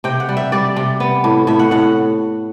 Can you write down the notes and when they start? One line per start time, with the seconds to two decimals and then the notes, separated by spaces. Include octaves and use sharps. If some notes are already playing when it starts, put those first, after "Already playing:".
0.04 C3 G5
0.20 F#5
0.29 G3
0.37 E5
0.52 G3 D5
0.76 C3
1.00 B3
1.24 A2
1.47 A2 E5
1.59 F#5
1.71 A2 F#5